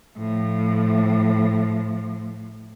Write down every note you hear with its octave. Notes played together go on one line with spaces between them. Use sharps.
A2 F3